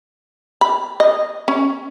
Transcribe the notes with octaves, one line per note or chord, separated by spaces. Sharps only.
B5
D#5
C#4